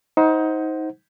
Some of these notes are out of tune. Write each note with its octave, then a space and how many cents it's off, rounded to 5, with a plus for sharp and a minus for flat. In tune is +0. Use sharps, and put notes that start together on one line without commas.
D#4 +25 C5 +0 F#5 +0